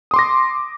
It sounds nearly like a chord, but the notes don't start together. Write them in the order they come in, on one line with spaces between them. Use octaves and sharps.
D#6 C6 D6 A#6